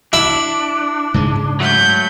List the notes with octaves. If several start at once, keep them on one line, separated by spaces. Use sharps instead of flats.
D4 E4
G#2 C#3 G#3
F#3 A3 B5 G6